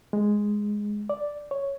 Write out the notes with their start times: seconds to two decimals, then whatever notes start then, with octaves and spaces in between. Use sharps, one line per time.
0.13 G#3
1.09 D5
1.51 C#5